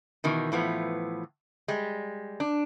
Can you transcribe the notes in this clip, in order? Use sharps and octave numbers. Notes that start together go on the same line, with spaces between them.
B2 D#3 E3
A2 E3 F3 B3
G3 G#3
D4